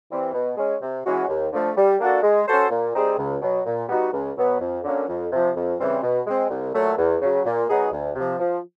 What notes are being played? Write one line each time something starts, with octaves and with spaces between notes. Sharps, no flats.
E3 G3 C4
B2
G#3 C#4
C3
E3 G#3 C#4 F#4
D#2
D3 F3 A3
G3
A#3 D4 F#4 A4
G#3
C#4 F#4 A4 C5
A#2
G3 C4 D#4 G#4
C#2
B2 F#3
A#2
G3 B3 D#4 F#4
C#2
B2 F#3 B3
F2
D3 F#3 A#3 C#4
F2
C3 F3
F2
C#3 E3 G3 C4
B2
G#3 C4
C2
A#2 F#3 A3
E2
C#3 F#3
A#2
F#3 B3 D#4 G#4
D2
C3 F3
F3